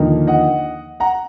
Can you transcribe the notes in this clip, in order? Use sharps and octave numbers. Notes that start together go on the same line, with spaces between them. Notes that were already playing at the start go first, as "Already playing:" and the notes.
Already playing: D#2 D3 F3 A#3 D#4
D#5 F#5
F#5 A#5